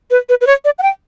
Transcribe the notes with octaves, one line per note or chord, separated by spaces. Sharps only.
B4
B4
B4
C#5
D5
F#5
G5